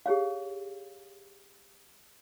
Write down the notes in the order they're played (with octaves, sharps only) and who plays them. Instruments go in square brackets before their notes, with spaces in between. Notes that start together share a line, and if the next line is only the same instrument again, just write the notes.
[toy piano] G4 G#4 C#5 F5